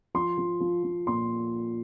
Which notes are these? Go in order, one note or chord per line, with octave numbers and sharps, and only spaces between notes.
F3 C6
F3
F3
F3
A#2 C6